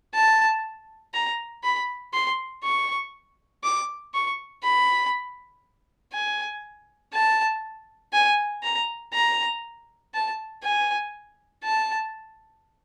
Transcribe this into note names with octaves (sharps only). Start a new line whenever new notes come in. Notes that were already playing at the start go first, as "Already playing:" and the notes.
A5
A#5
B5
C6
C#6
D6
C#6
B5
G#5
A5
G#5
A#5
A#5
A5
G#5
A5